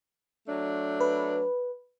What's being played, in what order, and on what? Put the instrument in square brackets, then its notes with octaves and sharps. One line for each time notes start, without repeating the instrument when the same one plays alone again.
[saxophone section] F#3 A3 D4
[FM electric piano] B4